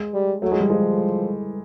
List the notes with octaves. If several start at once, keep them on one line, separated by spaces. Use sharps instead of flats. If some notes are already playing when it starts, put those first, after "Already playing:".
Already playing: G#3
G3
F#3 A3
G#3
G3
F3 G#3